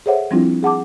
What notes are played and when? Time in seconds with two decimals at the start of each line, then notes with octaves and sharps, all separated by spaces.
0.06 G#4 A4 C5 C#5 E5 F#5
0.31 F3 G3 C4 D4 E4 F4
0.63 G#4 F#5 A5 D6